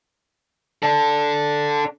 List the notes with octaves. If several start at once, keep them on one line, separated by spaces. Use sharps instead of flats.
D4 A4